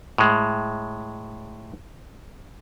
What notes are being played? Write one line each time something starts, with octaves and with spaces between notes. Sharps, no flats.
A2 G#3